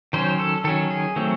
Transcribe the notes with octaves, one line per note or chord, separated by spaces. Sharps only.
D#3 F#3 C#4 C5
A4
D#3 F#3 C#4 A4
G#4
D#3 F#3 A3 C4